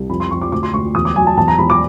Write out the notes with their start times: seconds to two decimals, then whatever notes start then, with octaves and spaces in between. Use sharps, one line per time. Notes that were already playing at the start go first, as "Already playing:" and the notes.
Already playing: C2
0.09 F2 B5
0.20 C6
0.31 F2 C#6
0.42 D6
0.52 D2 D6
0.63 C6
0.74 D2 C#6
0.95 E2 D#6
1.05 D6
1.16 F#3 G#5
1.27 A5
1.37 E2 A5
1.48 A#5
1.58 E2 B5
1.70 D6